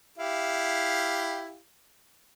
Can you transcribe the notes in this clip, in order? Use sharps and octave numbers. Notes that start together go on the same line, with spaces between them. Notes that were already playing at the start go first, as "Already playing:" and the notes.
E4 G4 F5